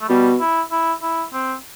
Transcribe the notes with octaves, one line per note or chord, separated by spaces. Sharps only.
A3
B2 G3
E4
E4
E4
C4